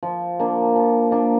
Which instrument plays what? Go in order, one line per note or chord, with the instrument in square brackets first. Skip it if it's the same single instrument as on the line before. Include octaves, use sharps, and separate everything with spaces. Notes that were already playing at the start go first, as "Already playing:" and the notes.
[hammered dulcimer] F3
A#3 D4
F3
A#3 D4